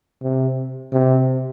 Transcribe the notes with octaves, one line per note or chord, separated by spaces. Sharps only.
C3
C3